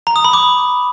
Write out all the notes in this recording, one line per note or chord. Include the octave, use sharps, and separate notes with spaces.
A#5
D#6
B5
D6